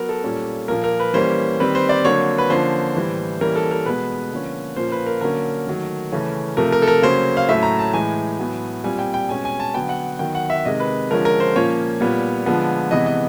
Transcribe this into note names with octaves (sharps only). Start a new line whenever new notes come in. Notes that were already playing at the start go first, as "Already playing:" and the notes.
Already playing: F#3 B3 A#4
A4
A#2 G3 A#3 C#4
A#2 F3 A#3 A#4
A#4
B4
E3 G3 A#3 C#4 C5
D#3 G3 C4 B4
C5
D5
D3 F#3 A#3 C#5
B4
D3 F3 A#3 C#4 C5
A2 E3 G3
E3 G3 A#3 C#4 A#4
A4
A#4
B2 G#3 B3 B4
D3 F3 A#3 C#4
A#2 F3 A#3 C#4 C5
B4
A#4
D3 F#3 A#3 C#4 A#4
D#3 F#3 A3
C#3 E3 A3 C#4
C3 F3 A3 A#4
A#4
A4
A#4
C#3 F#3 A#3 C#4 C5
F5
A2 F#3 A3 C#4 E5
A#5
A5
A2 E3 G#3 G#5
A2 F#3 B3
A#2 G3 C4 G#5
G5
G5
B2 G#3 C#4 G#5
G#5
A5
D3 F#3 B3 G5
F#5
D#3 F#3 B3 G5
F#5
E5
C3 D#3 G#3 D#5
B4
D3 F3 G#3 C#4 A#4
A#4
C5
A#2 F3 A#3 C#4 C#5
A#2 G3 B3
D3 F3 G#3 B3
C3 E3 G#3 B3 D#5
D#5